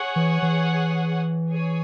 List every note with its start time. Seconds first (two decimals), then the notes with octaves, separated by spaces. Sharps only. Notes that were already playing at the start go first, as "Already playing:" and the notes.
Already playing: G#4 C#5 F#5
0.16 E3
0.42 E3
1.49 G#4 C#5 G#5